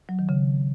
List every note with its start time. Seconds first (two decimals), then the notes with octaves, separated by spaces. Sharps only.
0.09 F#3
0.19 D#3
0.29 C#3